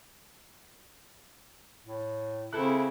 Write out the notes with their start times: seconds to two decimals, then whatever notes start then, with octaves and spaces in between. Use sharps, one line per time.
1.85 A2
2.53 C#3 C4 E4 A4 F#6